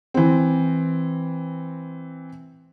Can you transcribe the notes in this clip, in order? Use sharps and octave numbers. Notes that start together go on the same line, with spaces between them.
E3 C4